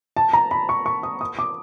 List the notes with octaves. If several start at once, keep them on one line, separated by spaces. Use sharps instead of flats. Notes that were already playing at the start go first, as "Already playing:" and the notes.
A5
A#5
B5
C#6
C#6
D#6
D#6
D6